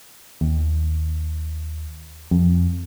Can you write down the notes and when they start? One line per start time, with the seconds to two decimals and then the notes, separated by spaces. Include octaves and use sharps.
0.41 D#2
2.31 F2